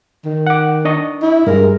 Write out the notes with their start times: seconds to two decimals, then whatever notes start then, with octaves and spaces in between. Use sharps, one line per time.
0.25 D#3
0.47 F#5 D6
0.85 D4 D#5 C#6
1.22 E4
1.47 G2 G#3 A#4